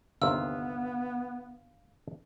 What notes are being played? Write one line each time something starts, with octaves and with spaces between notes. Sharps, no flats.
G1 D#2 C3 B3 F5 E6